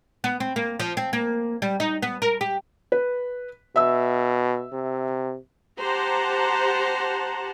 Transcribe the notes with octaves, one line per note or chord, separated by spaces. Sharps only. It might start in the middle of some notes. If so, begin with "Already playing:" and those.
B3
C4
A#3
F3
C4
A#3
G3
D#4
B3
A#4
G4
B4
B2 E5 E6
C3
G4 C5 F#5 A5 A#5